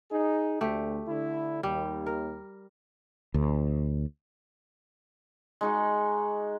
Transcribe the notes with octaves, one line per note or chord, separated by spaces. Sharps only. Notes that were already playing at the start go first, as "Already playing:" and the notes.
D#4 G#4
D2 A3 G4
D3 E4
D#2 G3
A#4
D2
G#3 D#4 F#4